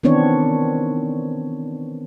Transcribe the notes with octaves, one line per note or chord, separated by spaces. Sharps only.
D#3 E3 B3 C4 D4 C#5